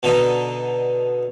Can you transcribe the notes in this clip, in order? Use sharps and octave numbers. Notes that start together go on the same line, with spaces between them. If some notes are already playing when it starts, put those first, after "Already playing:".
B2 D3 D#4